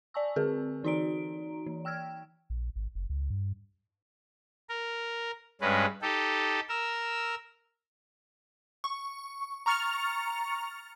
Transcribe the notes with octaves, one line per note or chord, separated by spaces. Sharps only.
D5 G#5 A5 C#6 E6
D3 C4 G#4 A#4
E3 D#4 F#4 D5 A#5 D7
E3
G5 E6 F6 G#6
A#1
G#1
F#1
C#2
G2
A#4
G2 G#3 C#4 B4
D#4 G4 A4
A#4 E6
C#6
A#5 C#6 F6 A6 C#7 F7